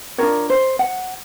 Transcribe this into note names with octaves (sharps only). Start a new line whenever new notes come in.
D4 F4 A#4 C#5
C5
F#5